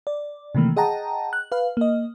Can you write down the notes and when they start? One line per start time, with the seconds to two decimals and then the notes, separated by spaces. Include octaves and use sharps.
0.07 D5
0.55 C3 D#3 E3 A3 A#3
0.76 G#4 D#5 F#5 G5 A5 A#5
1.33 F#6
1.52 B4 F5
1.77 A#3 D#5